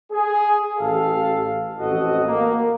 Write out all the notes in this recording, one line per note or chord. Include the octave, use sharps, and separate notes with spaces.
G#4
A1 G4 A4 F5
A1 F2 F#4 A4 D#5
A#3